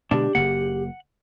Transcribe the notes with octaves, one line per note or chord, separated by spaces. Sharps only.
B2 D3 G#3 D4 G4
F#1 C#3 A#3 F#5